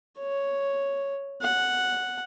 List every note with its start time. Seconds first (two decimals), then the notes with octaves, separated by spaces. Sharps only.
0.19 C#5
1.42 F#5